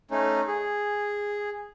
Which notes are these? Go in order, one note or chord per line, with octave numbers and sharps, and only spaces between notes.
A3 C#4 D#4
G#4